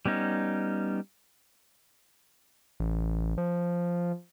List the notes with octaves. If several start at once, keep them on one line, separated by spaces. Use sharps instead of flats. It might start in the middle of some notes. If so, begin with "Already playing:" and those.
G3 B3 C#4 D#4
A1
F3